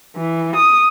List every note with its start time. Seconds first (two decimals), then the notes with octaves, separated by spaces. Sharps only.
0.16 E3
0.56 D#6